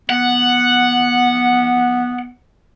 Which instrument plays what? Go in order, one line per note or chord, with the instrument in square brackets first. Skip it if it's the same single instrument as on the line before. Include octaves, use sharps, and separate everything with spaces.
[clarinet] B3 [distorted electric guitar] F#5